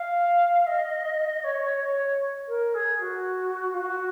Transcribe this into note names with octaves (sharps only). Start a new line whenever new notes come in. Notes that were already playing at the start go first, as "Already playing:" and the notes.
Already playing: F5
D#5
C#5
C#5
A#4
G#4
F#4
F4
F#4